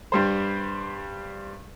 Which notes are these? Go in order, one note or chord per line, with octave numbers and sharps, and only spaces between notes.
G2 G3 C5